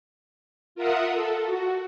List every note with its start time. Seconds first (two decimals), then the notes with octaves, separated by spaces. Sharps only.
0.75 F4 A#4 E5 F#5 D#6
1.14 A4
1.45 F#4